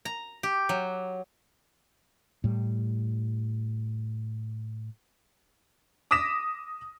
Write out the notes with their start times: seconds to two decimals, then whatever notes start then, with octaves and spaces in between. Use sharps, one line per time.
0.05 A#5
0.43 G4
0.69 F#3
2.44 A2 G3
6.11 D6 D#6 A#6 B6 E7